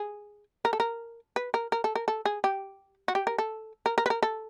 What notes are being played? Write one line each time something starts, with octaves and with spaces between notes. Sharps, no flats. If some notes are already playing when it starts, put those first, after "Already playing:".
Already playing: G#4
A#4
A4
A#4
B4
A#4
A#4
A4
A#4
A4
G#4
G4
F#4
G4
A#4
A4
A#4
A#4
B4
A#4
A4